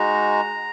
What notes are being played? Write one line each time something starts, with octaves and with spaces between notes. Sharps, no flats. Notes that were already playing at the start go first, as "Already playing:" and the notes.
Already playing: G#3 D#4 F#4 A#5